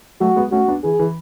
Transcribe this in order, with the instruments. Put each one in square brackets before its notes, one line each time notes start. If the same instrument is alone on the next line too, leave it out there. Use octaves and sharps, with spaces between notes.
[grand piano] F#3 A3 [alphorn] F#4
[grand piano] G#3 B3
[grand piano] A3 C#4 [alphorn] F#4
[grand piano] B3 D4
[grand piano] E3 [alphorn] G#4
[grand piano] E3